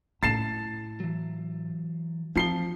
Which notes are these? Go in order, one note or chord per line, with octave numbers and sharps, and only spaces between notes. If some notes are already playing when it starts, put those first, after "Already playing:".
A2 C#4 E4 A5 A6 C7 E7
E3 F#3
F3 C4 C7 G7